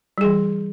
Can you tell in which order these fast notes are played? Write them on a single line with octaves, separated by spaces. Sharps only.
G3 G#4 E3